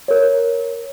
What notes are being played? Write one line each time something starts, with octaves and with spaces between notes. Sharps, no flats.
A#4 C#5